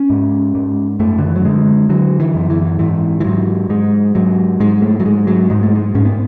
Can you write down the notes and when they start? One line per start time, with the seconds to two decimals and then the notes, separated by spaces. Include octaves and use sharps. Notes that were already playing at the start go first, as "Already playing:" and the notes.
Already playing: C#4
0.10 G#2
0.55 G#2
0.99 F#2 A3
1.18 D3
1.27 E3
1.36 F#3
1.44 D3 G#3
1.89 D3 F#3
2.20 E3
2.35 F#2
2.50 E3
2.79 G#2 E3
3.20 E3
3.25 G#2 F#3
3.69 G#2 G#3
4.15 G#2 F#3
4.60 G#2 G#3
4.82 A3
5.00 F#3
5.05 G#2 G#3
5.27 F#3
5.50 G#2 G#3
5.63 A3
5.75 G#3
5.95 G#2 C#4
6.05 B3